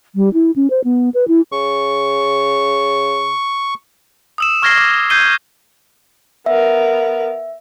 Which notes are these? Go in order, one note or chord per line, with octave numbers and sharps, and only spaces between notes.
G3
E4
C#4
C5
B3
B4
E4
C#3 C#6
D#6 E6 E7
C#6 F6 G#6 A#6 C7 G7
D6
G6 G#6 C7 D#7 G7
B3 A#4 E5